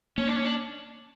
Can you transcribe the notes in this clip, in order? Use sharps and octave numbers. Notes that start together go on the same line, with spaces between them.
A#3 C#4
D4
C#4
D4